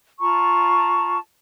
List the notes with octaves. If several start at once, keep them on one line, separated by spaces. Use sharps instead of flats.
F4 A5 A#5 C#6